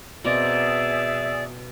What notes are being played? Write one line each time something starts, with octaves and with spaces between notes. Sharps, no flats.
B2 C4 G#4 D5 E5 A#5